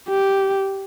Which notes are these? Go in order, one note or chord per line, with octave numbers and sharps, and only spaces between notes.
G4